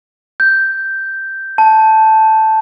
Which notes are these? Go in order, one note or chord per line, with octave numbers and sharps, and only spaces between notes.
G6
A5